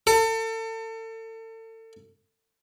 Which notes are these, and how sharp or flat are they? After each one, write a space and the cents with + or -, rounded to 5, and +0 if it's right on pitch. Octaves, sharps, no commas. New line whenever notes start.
A4 +35